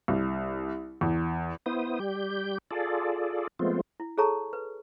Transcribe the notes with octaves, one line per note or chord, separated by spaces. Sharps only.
C2
E2
B3 E4 C5 D#6
G3 G4 G6
F4 G#4 A4 D5
F3 G#3 A3 B3 C4 F4
E4
G#4 A4 C#5 A5 A#5 C#6
B4